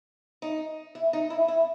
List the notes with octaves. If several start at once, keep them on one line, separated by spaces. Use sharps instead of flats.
D#4
E4
D#4
E4
E4